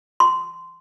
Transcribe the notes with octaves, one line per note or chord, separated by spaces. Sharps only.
C6